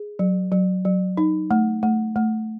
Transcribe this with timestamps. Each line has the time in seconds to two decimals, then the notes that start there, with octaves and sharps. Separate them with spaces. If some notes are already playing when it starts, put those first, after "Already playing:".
Already playing: G#4
0.19 F#3
0.52 F#3
0.85 F#3
1.17 D#4
1.51 A3
1.83 A3
2.16 A3